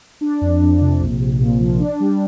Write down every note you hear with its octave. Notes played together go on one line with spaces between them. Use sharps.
D4
F2
F2
C3
A#1
A#1
A#2
F3
D4
G3